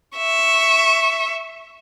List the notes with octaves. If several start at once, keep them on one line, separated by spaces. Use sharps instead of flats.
E5 C#6